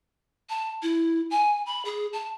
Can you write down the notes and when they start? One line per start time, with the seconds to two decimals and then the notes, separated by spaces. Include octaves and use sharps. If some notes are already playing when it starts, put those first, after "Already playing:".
0.49 A5
0.83 E4
1.30 G#5
1.66 B5
1.85 G#4
2.13 A5